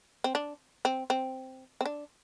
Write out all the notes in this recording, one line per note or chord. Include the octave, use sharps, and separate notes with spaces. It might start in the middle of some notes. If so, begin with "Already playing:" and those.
C4
D4
C4
C4
C4
D4